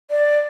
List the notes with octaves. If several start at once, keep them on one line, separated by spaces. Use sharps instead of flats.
D5